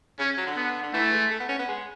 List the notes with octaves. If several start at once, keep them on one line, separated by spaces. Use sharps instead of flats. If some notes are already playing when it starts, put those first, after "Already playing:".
C#3 C#4
F#3
D3
B3
D3
E3 A3
G#3
A3
B3
C#4
B3
G#3